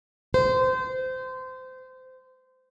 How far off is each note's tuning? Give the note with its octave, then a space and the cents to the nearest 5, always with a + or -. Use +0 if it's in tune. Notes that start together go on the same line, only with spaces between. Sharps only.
C5 -25